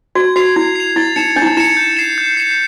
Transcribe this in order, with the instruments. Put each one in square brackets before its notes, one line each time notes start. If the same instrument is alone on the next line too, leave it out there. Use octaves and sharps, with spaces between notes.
[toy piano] F#4 [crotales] G#6
[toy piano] F#4 [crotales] C7 F7
[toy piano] E4 [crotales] G#6
[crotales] C7 F7
[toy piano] E4 [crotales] A6
[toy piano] D#4 [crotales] C#7 E7
[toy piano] D4 [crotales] A6
[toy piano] E4
D#4
[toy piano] E4 [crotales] C#7 E7
[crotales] G6
C7 E7
G6
C7 E7